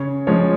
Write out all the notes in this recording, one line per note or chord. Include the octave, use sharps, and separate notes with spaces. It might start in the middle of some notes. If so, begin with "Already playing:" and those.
Already playing: C#3 C#5
F3 G#3 C#5